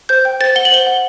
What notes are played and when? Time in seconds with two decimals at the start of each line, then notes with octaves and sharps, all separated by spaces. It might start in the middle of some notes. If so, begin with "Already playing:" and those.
0.09 C5 G6
0.25 G5
0.40 C5 A6
0.56 F#5 G7
0.65 F#7
0.72 C5 G7
0.87 F#5